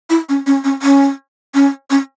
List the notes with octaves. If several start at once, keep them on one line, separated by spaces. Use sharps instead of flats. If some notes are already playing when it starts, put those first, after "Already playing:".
E4
C#4
C#4
C#4
C#4
C#4
C#4